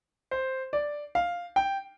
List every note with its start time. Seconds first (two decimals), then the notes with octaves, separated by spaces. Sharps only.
0.31 C5
0.73 D5
1.15 F5
1.56 G5